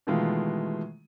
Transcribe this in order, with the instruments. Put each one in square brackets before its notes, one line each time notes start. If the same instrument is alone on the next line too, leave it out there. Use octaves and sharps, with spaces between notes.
[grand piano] B2 D#3 E3 G#3 A3 F4